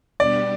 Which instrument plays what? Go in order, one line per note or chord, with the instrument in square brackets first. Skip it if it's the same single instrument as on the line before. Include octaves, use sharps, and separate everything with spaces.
[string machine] B2 G3 B3 D4 G4 [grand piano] D5